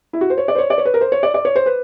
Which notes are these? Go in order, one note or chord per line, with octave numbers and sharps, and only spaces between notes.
E4
F#4
C5
C#5
D5
C5
C#5
D5
C#5
B4
A#4
C5
C#5
D5
D5
C#5
C5
B4